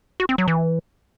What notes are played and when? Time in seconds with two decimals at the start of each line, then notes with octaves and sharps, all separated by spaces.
0.20 F#4
0.29 C4
0.38 F#3
0.48 E3